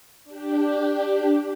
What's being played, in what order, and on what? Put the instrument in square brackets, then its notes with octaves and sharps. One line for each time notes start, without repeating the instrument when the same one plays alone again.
[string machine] D4 G4